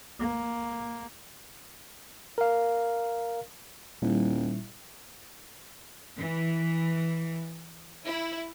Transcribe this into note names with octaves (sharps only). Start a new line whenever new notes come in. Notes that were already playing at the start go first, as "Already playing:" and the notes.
A#3
A#4 F5
D#1 A#2 G3 E4
E3
E4